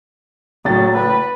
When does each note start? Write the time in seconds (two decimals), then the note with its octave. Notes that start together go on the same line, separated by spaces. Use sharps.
0.65 F#1 A2 F#3 A6
0.96 B4